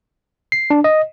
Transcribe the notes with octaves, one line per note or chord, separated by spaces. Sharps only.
C7
D4
D#5